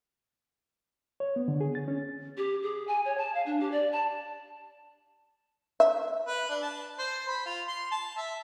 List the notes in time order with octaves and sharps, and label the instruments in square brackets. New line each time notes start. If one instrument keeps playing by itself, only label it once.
[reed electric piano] C#5
B3
D3
G#4
A6
C#4
[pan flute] G4
G#4
G#5
C#5
A5
F5
D4
G4
D5
A5
[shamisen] E5
[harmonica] B4
D4
A5
C5
B5
F4
C6
A5
E5